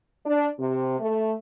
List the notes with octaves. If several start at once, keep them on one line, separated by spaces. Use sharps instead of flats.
D4
C3
A3